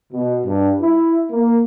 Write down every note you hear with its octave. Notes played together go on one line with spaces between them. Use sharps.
B2
G2
E4
A#3